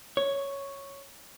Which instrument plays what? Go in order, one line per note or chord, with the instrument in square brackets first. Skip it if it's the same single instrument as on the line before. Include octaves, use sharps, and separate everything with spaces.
[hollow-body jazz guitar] C#5